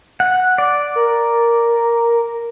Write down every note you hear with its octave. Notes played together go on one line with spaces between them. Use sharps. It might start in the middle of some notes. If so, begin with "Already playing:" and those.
F#5
D5
A#4